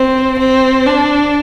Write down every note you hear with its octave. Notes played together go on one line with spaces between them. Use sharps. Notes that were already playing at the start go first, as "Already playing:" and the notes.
Already playing: C4
C4
D4